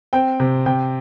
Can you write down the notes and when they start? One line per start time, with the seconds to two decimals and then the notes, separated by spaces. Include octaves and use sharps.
0.13 C4 G5
0.40 C3
0.66 C3 G5